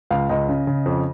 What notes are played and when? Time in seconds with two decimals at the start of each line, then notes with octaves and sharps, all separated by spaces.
0.11 C#2 F5
0.29 C#2 D#5
0.48 C#3
0.67 C#3
0.86 F2